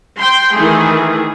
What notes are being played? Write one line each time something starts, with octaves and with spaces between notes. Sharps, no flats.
G5 C6
D#3 E3 A3 G#4